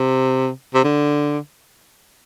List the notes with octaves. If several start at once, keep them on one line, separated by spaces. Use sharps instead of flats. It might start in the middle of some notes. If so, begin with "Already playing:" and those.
Already playing: C3
C3
D3